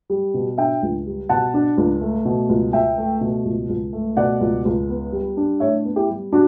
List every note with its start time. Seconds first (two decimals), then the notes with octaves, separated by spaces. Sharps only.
0.10 G3
0.34 B2
0.58 D4 E5 G5
0.83 C#2
1.06 G3
1.29 B2 F#5 A5
1.54 D4
1.78 C#2
2.01 A3
2.25 B2
2.49 C#2
2.73 C#2 E5 G5
2.98 A3
3.21 B2
3.45 C#2
3.69 C#2
3.93 A3
4.17 B2 D5 F#5
4.41 C#2
4.65 C#2
4.89 B3
5.12 G3
5.37 D4
5.60 A2 C#5 E5
5.85 B3
5.96 E4 G4
6.09 G3
6.33 D4 F#4